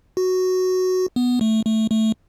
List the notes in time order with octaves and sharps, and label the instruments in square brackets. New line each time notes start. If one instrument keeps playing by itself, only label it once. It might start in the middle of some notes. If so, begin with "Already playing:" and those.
[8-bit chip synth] F#4
B3
A3
A3
A3